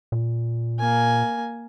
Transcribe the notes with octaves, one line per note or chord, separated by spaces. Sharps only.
A#2
A#3 G#5